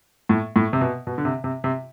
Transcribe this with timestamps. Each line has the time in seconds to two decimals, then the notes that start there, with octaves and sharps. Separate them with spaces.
0.29 A2
0.56 A2
0.73 C3
0.81 B2
1.07 B2
1.18 D3
1.25 C3
1.44 C3
1.64 C3